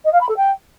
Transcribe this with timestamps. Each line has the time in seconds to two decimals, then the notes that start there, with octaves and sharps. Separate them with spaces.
0.05 D#5
0.13 F5
0.21 B5
0.29 A4
0.37 G5